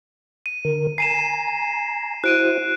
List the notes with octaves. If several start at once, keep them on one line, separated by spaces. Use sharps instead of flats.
D#7
D3 A#4
G#5 A#5 C7 D#7 E7
E4 F#4 C5 F#6 D7 D#7